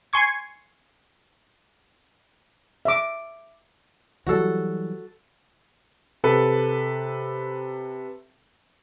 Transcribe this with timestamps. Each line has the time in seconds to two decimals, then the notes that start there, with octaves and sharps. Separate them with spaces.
0.13 G#5 C6 C#6 G#6
2.85 E5 D6
4.27 E3 F#3 G3 F#4 A4
6.24 C3 A4 B4